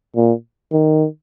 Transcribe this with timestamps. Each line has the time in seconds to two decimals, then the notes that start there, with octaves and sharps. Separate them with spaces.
0.16 A#2
0.72 D#3